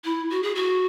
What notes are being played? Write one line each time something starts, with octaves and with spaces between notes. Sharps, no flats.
E4
F#4
G#4
F#4